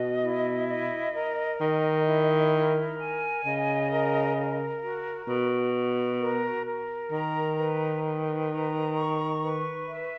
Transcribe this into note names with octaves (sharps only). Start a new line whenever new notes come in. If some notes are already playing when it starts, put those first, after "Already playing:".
Already playing: B2 D#5
E4
D#5
A#4
D#3 D#5
E4
A#4
G#5
C#3 D#5
A#4
A#4
F#4
B2 F#4
F#4
A#4
A#4
D#3 A#5
B4
B4
A#5
C#6
B4
E5